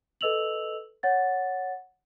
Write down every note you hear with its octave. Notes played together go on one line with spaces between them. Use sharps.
A4 B4 D#5 E6 F7 F#7
C#5 F#5 A6